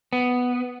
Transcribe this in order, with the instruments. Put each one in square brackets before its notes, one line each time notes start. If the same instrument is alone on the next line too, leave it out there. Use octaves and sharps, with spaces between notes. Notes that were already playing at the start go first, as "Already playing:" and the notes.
[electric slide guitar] B3